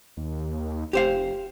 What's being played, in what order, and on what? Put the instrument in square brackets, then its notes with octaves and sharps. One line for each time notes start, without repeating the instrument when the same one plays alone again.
[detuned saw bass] D#2
[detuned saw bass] F1 [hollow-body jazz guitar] G4 C5 F5